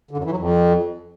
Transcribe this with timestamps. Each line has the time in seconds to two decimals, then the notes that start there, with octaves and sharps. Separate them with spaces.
0.11 D3
0.17 F#2
0.24 E3
0.30 F#3
0.37 F2